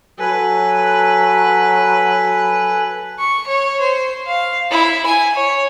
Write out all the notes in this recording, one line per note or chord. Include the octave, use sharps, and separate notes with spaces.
F#3 A4 B4 G#5
C#6
C#5
C5
F5
E4
G#5
C#5